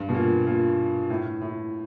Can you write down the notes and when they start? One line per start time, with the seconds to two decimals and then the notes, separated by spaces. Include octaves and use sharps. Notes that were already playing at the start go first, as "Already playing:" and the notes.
Already playing: G2
0.09 B2
0.14 A#2
0.47 A#2
1.10 A2
1.42 A2